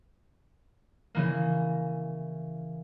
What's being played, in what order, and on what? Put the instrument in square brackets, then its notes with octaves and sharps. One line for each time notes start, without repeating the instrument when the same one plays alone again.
[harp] C#3 E3 A#3